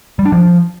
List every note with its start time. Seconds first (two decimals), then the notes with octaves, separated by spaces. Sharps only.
0.19 G3
0.25 D4
0.32 F3